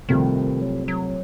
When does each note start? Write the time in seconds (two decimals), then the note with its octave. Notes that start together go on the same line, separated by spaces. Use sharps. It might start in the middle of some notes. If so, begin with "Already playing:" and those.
0.09 C2 C3 D#3 F3 A3 C4
0.62 F#3
0.88 F#3